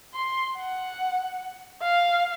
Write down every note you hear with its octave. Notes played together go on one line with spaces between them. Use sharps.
C6
F#5
F5